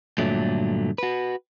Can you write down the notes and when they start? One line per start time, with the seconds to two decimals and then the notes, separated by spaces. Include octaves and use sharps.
0.18 G2 A#2 D3 F#3 A3
0.98 F#4 B4